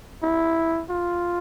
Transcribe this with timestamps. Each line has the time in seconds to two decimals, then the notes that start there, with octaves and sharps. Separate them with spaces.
0.22 E4
0.90 F4